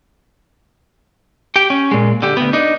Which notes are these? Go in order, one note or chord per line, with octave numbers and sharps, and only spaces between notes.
G4 G5
C#4
A#2 G#3
D3 G4
D2 B3
D4 D#4